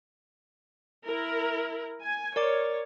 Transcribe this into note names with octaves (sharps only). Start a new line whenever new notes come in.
E4 A#4
G#5
A#4 C#5 D5 D6